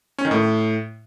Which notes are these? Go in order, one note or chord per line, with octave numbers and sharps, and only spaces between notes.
C#4
D#3
A2